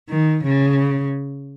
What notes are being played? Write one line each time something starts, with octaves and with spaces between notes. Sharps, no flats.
D#3
C#3